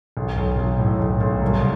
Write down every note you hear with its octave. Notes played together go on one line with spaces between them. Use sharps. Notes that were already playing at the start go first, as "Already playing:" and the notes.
B1
B1
B1
A2
B1
B1
C2